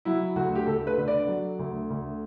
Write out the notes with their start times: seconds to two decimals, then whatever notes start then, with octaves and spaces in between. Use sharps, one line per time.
0.05 F#3 E4
0.36 D2 F#4
0.55 G4
0.67 D2 A4
0.87 B4
0.97 D3
1.08 D5
1.28 F#3
1.59 D2
1.90 D2